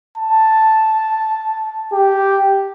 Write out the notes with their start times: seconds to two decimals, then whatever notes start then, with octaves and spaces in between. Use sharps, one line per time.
0.18 A5
1.93 G4